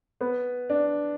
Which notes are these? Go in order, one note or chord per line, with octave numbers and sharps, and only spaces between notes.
B3
D4